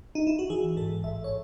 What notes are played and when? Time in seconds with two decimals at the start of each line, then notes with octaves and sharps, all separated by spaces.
0.15 D#4
0.27 E4
0.39 F#4
0.50 E3 G#4
0.77 G#2 A4
1.04 A1 E5
1.24 C#5